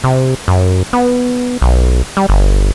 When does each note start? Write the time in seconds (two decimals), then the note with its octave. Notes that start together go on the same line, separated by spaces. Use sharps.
0.04 C3
0.48 F#2
0.93 B3
1.61 B1
2.17 G3
2.29 G1